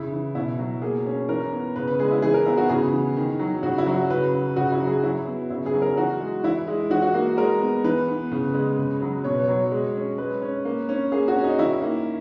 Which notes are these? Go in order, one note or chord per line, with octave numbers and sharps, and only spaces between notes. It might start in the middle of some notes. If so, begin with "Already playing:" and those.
Already playing: C#3 E4
E3
B2 E4
F#3
A#3 G#4
C#4
E3 A#4
B3
C#3 B4
B4
G#3 G#4
E4
E3 G#4
A#4
B3 E4
F#4
C#3 G#4
E3
D#3
F#3
C#3 F#4
E4
F#3
F#4
C#3 B4
F#3
C#3 F#4
E4
F#3
G#4
F#3 E4
B3
C#3 E4
G#4
F#3
A#4
E3 F#4
G#3
E3 E4
G#3
E3 F#4
F#4
A#3
G#3 A#4
B3
E3 B4
B3
C#3
G#3
C#3
F#3
B2 C#5
B4
F#3 C#5
G#3
C#4
G#3 B4
C#4
A#3
C#4
A#3 G#4
F#4
C#4
D#4
D#3 E4
A#3